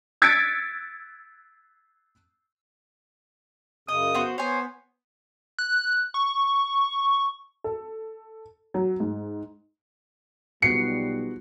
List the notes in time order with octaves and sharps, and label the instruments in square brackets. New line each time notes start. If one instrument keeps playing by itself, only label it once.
[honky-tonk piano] E6 G#6 A6 B6 C#7 D7
[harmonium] F#2 C#3 [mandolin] D#5 [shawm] D#6
[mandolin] B3 F#4 C5
[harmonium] B3 [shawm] C5 [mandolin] C#5 G#5
[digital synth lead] F#6
C#6
[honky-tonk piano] A4
F#3
G#2
[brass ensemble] B1 G3 [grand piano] F3 B3 F#4 [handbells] C7 [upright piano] C#7